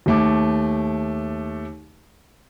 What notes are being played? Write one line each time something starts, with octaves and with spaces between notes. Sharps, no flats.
D#2 A3 D6